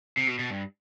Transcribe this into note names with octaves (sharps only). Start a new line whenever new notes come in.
C3
B2
B2
G2